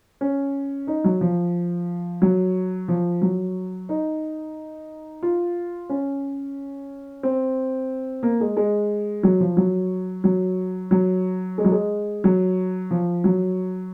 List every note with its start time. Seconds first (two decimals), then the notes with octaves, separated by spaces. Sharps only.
0.21 C#4
0.87 D#4
1.04 F#3
1.21 F3
2.22 F#3
2.88 F3
3.22 F#3
3.89 D#4
5.23 F4
5.90 C#4
7.23 C4
8.23 A#3
8.40 G#3
8.57 G#3
9.23 F#3
9.40 F3
9.57 F#3
10.24 F#3
10.91 F#3
11.58 G#3
11.65 F#3
11.72 G#3
12.24 F#3
12.91 F3
13.24 F#3